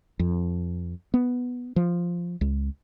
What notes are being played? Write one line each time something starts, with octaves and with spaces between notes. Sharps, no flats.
F2
B3
F3
C#2